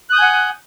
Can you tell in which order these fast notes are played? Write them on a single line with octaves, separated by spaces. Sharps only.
F#6 D#6 G6 G#5 F#5